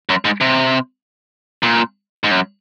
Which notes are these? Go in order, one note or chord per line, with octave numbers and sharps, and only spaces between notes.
F#2
G#2
C3
A#2
G#2
F#2